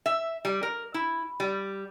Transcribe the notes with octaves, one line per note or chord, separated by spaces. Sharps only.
E5
G3
A#4
E4
G3